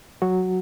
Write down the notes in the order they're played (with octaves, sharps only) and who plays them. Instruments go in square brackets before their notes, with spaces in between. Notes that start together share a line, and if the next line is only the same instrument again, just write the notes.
[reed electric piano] F#3 F#4